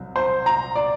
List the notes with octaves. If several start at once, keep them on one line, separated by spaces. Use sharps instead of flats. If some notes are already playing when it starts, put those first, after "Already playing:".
Already playing: C2 C3 F#3
C5
A#5
D5